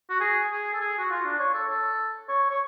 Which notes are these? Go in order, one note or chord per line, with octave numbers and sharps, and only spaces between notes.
F#4
G#4
G#4
A4
G#4
F#4
F4
D4
C#5
A4
A4
C#5
C#5